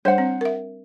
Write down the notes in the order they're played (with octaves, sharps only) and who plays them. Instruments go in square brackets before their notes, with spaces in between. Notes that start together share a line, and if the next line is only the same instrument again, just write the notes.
[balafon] G3 D4 C#5 [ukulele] C5 F#5
[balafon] C4
A#4 E5